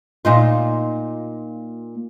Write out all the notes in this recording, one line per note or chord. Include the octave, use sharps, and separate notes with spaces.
A#2 D#4 F4